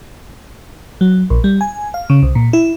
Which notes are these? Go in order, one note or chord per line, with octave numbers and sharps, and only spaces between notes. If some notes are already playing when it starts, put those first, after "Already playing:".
F#3
A#1
G3
G#5
F5
C#3
C2
A#2
E4